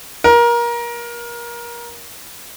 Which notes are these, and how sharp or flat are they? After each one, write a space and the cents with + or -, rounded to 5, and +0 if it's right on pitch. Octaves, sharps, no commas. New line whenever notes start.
A#4 +25